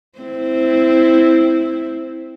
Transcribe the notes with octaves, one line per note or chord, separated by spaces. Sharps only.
C4 E4